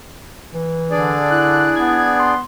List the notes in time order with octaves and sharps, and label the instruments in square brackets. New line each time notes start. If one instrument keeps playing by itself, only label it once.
[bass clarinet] E3
[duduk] D3 [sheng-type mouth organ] D4 G#4 D5
[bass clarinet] E4 [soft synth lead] F#6
[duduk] B3 [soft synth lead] G#6
[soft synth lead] C6